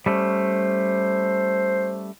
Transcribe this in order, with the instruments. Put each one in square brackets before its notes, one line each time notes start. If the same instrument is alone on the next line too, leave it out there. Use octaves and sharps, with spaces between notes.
[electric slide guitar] G3 A3 C#4 [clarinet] C5